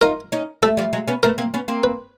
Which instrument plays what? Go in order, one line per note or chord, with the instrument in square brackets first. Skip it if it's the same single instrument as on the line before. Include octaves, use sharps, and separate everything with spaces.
[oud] D#4 F4 [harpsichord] A#4
[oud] C#4 D#4
[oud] G3 A3 [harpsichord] A4
[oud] F3 G3
F#3 G#3
B3 C#4
[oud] A3 B3 [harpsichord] A#4
[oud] A#3 C4
B3 C#4
A#3 C4
[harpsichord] B4